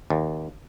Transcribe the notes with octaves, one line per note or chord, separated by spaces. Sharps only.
D#2